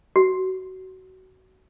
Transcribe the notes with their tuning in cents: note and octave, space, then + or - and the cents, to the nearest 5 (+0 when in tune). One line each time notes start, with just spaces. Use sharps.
F#4 +20